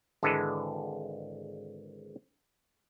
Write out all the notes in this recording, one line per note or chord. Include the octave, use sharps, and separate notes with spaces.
G#1 D3 E3 G#3 A4 B4